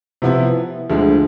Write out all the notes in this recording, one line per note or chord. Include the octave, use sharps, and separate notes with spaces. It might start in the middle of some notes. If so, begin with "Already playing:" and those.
C3 F3 B3 E4
D2 D3 F3 G#3